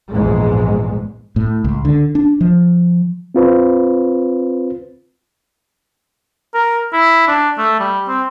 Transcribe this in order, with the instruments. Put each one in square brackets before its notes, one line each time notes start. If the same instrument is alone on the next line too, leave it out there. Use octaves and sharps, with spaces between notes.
[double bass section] A#1 E2 G#2 G#3
[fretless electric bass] A2
C#2
D3
D4
F3
[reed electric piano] C4 F4 B4 C5
[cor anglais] A#4
E4
D4
A3
G3
C4